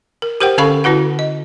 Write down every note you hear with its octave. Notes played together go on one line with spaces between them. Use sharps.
A#4
G4 A#4 C5 F#5 G5
D3 C#4 A4 F5 B5 C#6
D3 E4 F#4 B4 F#5
D#5